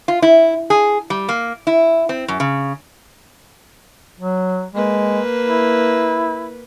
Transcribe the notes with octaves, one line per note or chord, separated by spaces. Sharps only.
F4
E4
G#4
G3
A#3
E4
C4
F#2
C#3
F#3
G#3 A#3 B4
E4